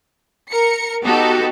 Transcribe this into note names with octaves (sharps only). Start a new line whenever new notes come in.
A#4 C#7
B3 D#4 F#4 G4 A4